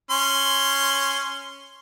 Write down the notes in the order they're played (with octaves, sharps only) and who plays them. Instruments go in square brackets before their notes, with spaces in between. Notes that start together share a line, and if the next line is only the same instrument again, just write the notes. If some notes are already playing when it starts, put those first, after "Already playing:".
[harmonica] C#4 C6